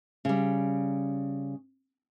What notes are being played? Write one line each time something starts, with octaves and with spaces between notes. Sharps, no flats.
C#3 G3